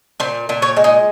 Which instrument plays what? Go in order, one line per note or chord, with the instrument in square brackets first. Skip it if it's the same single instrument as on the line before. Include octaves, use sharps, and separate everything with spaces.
[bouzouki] A#2 C5
A#2
C#5
G#3
D#4